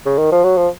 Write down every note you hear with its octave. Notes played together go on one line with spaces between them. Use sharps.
C#3
D#3
F3
F#3
F3